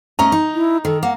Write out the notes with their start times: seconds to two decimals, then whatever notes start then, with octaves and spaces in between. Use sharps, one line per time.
0.19 A3 C#4 D#5 A#5
0.32 D#4
0.55 E4
0.85 D#3 A4
1.03 A#3 F#5